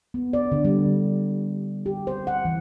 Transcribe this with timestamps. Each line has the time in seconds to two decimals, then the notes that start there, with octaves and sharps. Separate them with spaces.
0.14 B3
0.33 D5
0.52 D3
0.65 G3
1.86 G4
2.07 C5
2.27 F#5
2.45 E3